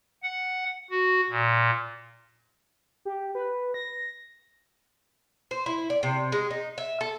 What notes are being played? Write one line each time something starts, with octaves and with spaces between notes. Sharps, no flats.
F#5
F#4
A#2
G4
B4
A#6
C5
E4
D5
C3
G#3
D#4
E5
A4